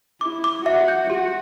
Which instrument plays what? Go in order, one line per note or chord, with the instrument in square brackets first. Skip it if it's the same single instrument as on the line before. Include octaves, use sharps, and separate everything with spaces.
[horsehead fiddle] E4 [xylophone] D6
[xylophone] D6
[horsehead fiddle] F#4 [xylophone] E5
[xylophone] G6
[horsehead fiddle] F#4 [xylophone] G4